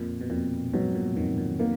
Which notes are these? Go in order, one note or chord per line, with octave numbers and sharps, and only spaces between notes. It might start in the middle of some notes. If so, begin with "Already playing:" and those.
Already playing: F2 A#2
B2
F2 A#2
G#2 B2 F#3
A#2
F2 B2 D#3
A#2
B2 D#3 A#3